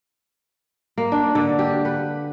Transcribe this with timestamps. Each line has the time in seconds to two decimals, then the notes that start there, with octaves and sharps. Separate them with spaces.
0.98 A#3
1.12 D4
1.35 D3
1.59 G4
1.85 B4